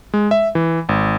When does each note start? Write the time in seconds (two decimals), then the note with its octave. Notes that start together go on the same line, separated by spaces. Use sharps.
0.14 G#3
0.31 E5
0.55 E3
0.89 G#1